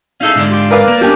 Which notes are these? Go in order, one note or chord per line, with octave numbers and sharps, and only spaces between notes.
C#4 D#4 G#4 A4 E5 F5
G#2 D3 D4
F4 G4
A#4 B4 D5 F5
A#3
A#2 G3 B3 C#4 D4 G4